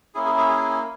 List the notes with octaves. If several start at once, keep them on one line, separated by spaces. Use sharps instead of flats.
A#3 C#4 E4 G#4
G#4
G#4
G#4